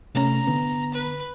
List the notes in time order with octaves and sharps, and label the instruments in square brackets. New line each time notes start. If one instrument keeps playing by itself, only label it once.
[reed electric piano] C3 A3 C#4 [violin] A#5
[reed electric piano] D3 B3
[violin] B4